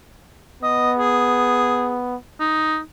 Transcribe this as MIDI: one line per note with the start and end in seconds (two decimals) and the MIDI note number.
0.63 2.16 59
0.63 0.92 75
0.98 1.96 68
2.40 2.78 63